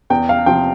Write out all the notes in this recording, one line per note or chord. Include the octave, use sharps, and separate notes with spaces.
E2 G5
F5
C3 F3 G5